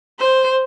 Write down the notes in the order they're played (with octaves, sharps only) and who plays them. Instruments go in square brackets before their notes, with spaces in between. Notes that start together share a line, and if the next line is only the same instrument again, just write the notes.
[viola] C5